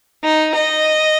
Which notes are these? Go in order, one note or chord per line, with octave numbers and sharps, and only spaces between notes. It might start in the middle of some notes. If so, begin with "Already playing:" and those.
D#4
D#5